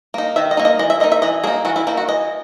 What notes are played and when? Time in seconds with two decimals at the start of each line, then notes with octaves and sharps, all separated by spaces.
0.14 A#3 D#4
0.36 D#3 E5
0.51 D#5
0.57 A#3 D#4
0.65 D#5
0.79 E3 D#5
0.90 E5
1.00 A#3 D#5
1.04 D#4
1.12 E5
1.22 E3 D#5
1.44 A#3 D#4 G#4
1.65 E3 F#4
1.76 E4
1.87 A#3 D#4 E4
1.97 F#4
2.08 E3 D#5